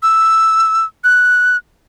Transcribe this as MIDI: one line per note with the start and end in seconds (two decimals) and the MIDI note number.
0.03 0.85 88
1.04 1.57 90